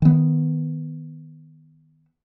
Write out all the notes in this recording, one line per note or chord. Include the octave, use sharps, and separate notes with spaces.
D#3 B3